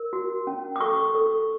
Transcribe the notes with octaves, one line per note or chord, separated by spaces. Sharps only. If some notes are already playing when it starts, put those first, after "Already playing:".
Already playing: A#4
F#4
C#4
D6
A4 C#6
A4